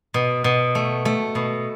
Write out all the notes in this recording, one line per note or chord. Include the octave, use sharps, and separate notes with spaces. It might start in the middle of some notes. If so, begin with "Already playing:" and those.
B2
B2
A3
A3
B2